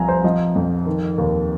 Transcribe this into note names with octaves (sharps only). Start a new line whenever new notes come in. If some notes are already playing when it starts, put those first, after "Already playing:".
Already playing: C2 F3 G#5 A#5
C5
F3 D#5
F2
D#3
D#2